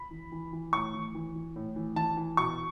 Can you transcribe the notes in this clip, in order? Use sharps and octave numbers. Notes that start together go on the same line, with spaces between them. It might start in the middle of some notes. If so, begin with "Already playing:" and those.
Already playing: B5
E3
E3
E3
A2 C#6
E3
E3
E3
A2
E3
E3 A5
E3
B2 C#6